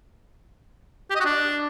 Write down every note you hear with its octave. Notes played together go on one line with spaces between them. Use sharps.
G4
D#5
F#4
D4